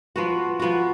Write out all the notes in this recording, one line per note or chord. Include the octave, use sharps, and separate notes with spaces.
F3 B3 F#4
F3 B3 F#4